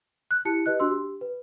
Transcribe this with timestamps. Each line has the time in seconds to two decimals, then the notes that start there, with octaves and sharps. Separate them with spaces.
0.31 F#6
0.45 E4 G4 A5 C#7
0.66 G4 B4 D#5 F#6
0.79 D4 F#4 C6 E6
0.91 G4
1.21 B4